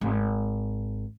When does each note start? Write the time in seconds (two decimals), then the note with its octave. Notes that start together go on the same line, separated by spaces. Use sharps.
0.01 G#1